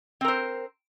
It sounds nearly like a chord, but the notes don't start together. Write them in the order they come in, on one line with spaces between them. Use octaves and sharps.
C4 A#4 C5